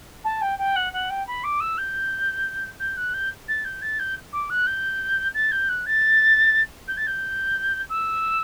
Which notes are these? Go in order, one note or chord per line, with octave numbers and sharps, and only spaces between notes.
A5
G5
G5
F#5
F#5
G5
B5
D6
E6
G6
G6
F#6
G6
A6
G6
A6
G6
D6
F#6
G6
A6
G6
F#6
A6
G6
A6
G6
E6